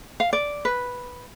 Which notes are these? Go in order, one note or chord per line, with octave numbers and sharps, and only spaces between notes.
F5
D5
B4